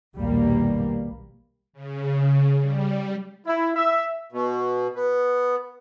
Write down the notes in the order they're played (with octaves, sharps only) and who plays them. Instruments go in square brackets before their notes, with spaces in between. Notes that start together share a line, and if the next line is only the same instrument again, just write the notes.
[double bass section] A#1 D#2 B2 G3 A#3
[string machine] C#3
G3
[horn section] E4
E5
[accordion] B2
B3